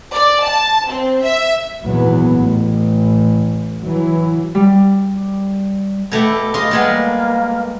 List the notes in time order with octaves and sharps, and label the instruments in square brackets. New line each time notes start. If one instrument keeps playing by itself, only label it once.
[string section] D5
A5
C4
E5
[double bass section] G#1 E2 A#2 F#3 B3
A1
E3 F#3
[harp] G3
[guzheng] B2 A3 G4 [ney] A4
[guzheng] F4 D#5 C6 [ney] G#4
[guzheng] G3 G#3 B3 [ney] A#3